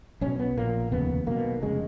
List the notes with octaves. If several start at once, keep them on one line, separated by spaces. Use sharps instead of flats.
B1 B2 C#4
B3
A#1 A#2 A#3
F1 D#2 C#3 B3
B1 B2 A#3
F1 C#3 G#3